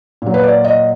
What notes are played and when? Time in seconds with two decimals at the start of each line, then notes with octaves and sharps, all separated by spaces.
0.22 A#2 F#3
0.34 B4
0.43 D5
0.64 D#5